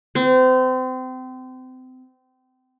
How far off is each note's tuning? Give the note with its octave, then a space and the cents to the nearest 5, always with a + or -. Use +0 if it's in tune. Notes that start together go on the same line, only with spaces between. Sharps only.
C4 -30